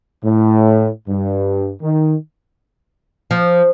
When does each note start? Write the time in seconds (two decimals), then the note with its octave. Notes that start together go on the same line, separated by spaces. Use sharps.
0.24 A2
1.09 G2
1.82 D#3
3.31 F3